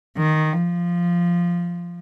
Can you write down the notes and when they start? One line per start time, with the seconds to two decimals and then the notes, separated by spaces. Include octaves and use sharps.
0.18 D#3
0.54 F3